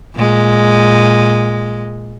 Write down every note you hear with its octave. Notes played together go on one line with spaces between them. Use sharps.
A#2 G#3